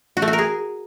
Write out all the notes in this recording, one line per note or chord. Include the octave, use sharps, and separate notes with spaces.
F#4
A3
F#4
A#4
G#4